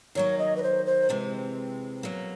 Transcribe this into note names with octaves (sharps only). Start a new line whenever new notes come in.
D#3 F#3 A#3 C#5
D#5
B4
C5
C5
C3 E3 G#3 C4
B2 F#3 A#3